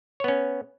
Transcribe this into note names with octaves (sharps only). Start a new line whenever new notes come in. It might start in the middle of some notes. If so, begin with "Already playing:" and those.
B3 C#4 C#5